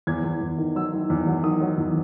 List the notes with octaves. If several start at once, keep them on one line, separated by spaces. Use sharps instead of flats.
E2 G#6
E2
E2
D#3
F#3 E6
D#3
E2
F#3
D#3 D#6
F#3
E2